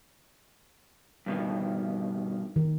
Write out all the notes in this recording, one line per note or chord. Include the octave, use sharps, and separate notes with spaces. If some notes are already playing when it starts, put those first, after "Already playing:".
G2 B2 D#3
D#3